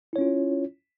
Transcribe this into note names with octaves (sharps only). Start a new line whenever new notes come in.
C#4 E4 F4 C#5